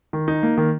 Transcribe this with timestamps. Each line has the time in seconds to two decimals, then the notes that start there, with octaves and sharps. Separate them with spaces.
0.13 D#3
0.28 D#4
0.43 A#3
0.58 D#3